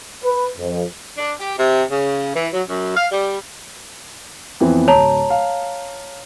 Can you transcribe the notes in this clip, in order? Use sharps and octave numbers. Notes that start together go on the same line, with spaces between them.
B4
F2
D4
G4
C3
C#3
E3
F#3
F#2
F5
G3
F2 E3 B3
D1 C#5 A5 A#5 F7
F5